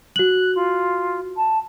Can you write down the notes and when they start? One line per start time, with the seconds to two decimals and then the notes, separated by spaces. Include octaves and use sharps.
0.16 F#4 F#6 F#7
0.55 F4
1.36 A5